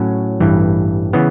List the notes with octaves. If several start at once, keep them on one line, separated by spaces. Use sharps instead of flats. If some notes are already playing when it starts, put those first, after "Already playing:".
Already playing: A2 F#3 C#4 F#4
A1 G2 E3
C#3 E3 B3